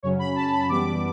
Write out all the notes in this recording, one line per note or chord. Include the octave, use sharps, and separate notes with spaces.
F#2 C#3 F#3 C#4 C#5
B5
A5
B5
F#2 E3 G3 B3 D6